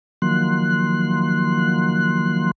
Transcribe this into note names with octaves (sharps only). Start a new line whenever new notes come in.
D#3 F3 F#3 A#3 C6 F#6